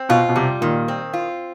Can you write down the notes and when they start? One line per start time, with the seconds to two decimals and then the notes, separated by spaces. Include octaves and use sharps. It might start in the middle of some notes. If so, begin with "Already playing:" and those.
Already playing: C4
0.09 B2 F4
0.29 B2
0.36 C3 G3
0.61 A#2 D#3
0.88 C4
1.14 F4